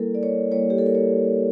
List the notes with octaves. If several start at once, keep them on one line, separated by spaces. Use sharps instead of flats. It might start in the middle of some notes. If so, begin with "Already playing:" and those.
Already playing: G3 A#3 E4 A4 A#4
D5
C#5
G3 A#3 E4 C#5
G4
A4
A#4
C#5